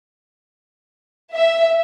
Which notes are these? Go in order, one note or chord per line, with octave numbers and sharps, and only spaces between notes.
E5